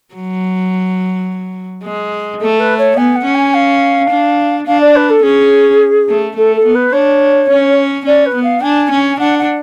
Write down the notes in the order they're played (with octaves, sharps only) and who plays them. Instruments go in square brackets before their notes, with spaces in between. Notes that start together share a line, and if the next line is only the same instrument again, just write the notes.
[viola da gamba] F#3
G#3
[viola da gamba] A3 [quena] A4
[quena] B4
C#5
[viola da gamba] B3 [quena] G#5
[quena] F#5
[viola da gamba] C#4
[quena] G#5
F5
[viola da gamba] D4
[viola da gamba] D4 [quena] F5
[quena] D5
B4
A4
[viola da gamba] C#4 [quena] G#4
[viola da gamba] A3
[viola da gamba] A3 [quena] A4
[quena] A4
[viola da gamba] B3
[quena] B4
[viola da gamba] D4 [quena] C#5
[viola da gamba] C#4
[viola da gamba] C#4 [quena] D5
[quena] B4
[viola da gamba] B3
[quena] F5
[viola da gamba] D4 [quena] G#5
[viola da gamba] C#4
[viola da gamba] D4 [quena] F#5
[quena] F#5